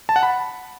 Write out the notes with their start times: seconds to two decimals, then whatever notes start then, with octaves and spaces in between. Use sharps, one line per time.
0.09 A5
0.16 F#5
0.23 B5